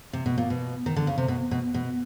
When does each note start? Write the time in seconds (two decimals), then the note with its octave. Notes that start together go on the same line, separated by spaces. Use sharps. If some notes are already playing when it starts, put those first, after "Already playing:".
0.13 C3
0.26 B2
0.38 A#2
0.50 B2
0.86 D#3
0.96 D3
1.07 C#3
1.18 C3
1.28 B2
1.51 B2
1.74 B2